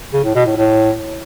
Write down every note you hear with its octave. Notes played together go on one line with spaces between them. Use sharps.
C#3
A2
B2
A2
A2